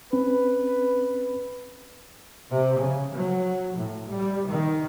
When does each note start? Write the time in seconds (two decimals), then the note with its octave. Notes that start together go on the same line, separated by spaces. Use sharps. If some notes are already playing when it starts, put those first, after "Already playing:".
0.13 C4 C#4 B4
2.50 C3
2.79 C#3
3.14 F#3
3.76 A2
4.08 G3
4.48 D#3